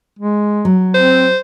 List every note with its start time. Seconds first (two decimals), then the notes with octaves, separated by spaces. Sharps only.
0.19 G#3
0.65 F#3
0.94 C4 C5